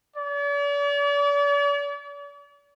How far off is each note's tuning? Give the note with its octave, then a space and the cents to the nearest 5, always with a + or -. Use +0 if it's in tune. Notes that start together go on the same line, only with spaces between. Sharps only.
D5 -45